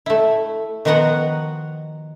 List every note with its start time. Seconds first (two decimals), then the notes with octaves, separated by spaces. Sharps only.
0.06 A3 E4
0.85 D#3 F3 B3 F#4 F#5 A#5